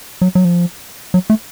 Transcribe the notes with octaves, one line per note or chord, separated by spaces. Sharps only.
F#3
F#3
F3
F#3
A3